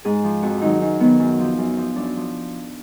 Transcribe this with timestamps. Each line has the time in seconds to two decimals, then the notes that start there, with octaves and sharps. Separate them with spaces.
0.05 G#2 G#4
0.24 F3
0.42 F2 F#4
0.62 D#3 F#3 D#4
0.81 F#2 D#4
1.00 D#3 F#3 B3
1.20 F#2
1.39 F3
1.58 F#2
1.77 F3
1.96 F#2 D4
2.16 F3